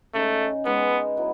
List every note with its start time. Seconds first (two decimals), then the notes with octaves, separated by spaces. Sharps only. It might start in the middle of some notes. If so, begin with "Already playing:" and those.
0.14 C#3 G#3 A3 D#4
0.65 G#3 B3 D#4 G#4 B4
1.17 F#3 B3 E4 B4